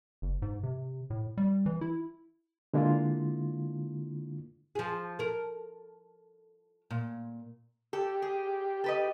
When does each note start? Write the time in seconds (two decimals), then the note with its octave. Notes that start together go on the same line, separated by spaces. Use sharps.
0.22 F#1
0.42 G#2
0.63 C3
1.10 A2
1.37 G3
1.66 E3
1.81 E4
2.74 D3 G#3 A#3 D4 E4 F4
4.75 F3 G#4
5.19 A4 A#4
6.90 A#2
7.93 G4 A4
8.22 G#4
8.84 A4 B4 D#5